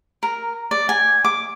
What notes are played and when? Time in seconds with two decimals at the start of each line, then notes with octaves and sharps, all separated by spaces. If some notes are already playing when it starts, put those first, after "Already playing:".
0.23 A#4
0.71 D5
0.89 G#5
1.25 D6